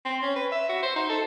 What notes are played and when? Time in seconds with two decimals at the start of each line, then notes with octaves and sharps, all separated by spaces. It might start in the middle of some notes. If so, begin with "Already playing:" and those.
0.05 C4
0.22 C#4
0.36 B4
0.52 E5
0.69 F#4
0.83 C5
0.96 D#4
1.09 A4